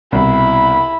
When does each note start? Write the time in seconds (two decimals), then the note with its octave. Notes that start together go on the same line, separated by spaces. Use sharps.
0.12 C2 B2 E4 B5